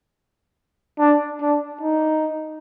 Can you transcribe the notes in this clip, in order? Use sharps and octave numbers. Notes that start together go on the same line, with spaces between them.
D4
D4
D#4